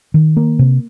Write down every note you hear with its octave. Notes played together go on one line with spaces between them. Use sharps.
D#3
A#3
C3